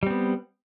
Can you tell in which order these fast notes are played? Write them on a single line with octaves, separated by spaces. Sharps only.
G3 C4 B3